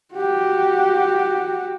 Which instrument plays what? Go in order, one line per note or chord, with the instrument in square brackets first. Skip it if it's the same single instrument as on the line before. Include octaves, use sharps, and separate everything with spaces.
[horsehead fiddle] F#4 G4